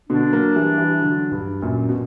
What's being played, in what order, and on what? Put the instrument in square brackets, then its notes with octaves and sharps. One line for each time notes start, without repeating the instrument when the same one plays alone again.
[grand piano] B2 D3 [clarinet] D4
[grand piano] F#3 A#3
E3 G3
E3 G3
D3 F#3
G2
F#2 A#2
B2